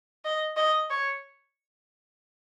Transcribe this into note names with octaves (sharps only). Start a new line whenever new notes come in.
D#5
D#5
C#5